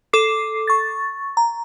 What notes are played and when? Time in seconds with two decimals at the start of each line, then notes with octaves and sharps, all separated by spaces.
0.13 A4 D6 C7
0.67 C#6 A6
1.37 A#5